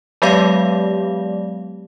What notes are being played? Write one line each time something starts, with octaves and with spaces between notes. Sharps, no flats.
F#3 G#3 B3 G4 D5 F5